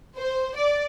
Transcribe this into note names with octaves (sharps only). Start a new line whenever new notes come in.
C5
D5